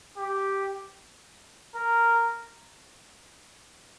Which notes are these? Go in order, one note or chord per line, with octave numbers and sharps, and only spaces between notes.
G4
A#4